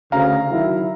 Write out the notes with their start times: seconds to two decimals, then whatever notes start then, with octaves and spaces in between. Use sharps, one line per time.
0.12 D2 C#3 F5 A#5
0.51 D#3 F#3 E4